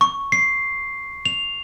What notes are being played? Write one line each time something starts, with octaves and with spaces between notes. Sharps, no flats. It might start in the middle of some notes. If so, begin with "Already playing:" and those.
C#6
C7
F7